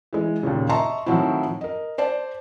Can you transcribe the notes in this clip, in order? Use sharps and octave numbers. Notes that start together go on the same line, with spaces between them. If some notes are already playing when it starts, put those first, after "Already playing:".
E3 G#3
D#2 A#2 C#3
D#5 E5 A5 A#5 C6 C#6
A2 D#3 F3 F#3 C4 E4
A#4 D#5
C5 D5 A5